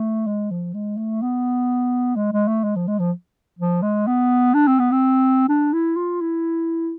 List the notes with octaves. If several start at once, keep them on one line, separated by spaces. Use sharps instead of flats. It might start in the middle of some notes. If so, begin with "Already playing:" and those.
Already playing: A3
G#3
F3
G#3
A3
B3
G#3
G#3
A3
G#3
F3
G#3
F3
F3
G#3
B3
D4
C4
B3
C4
D4
E4
F4
E4